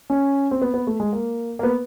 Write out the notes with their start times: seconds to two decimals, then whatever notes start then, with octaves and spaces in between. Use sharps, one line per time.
0.10 C#4
0.51 C4
0.62 B3
0.74 B3
0.87 A3
1.00 G#3
1.13 A#3
1.59 A#3
1.63 B3